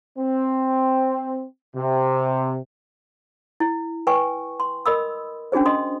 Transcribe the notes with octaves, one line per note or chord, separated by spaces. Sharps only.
C4
C3
E4
B4 G5 G#5 C#6
C6
A#4 D#5 B5 D#6 E6
C#4 D4 F#4 G#4 C5
D#5 C6 D#6